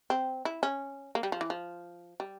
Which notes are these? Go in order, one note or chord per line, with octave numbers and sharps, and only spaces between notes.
C4
E4
C#4
A#3
G3
F3
E3
F3
G3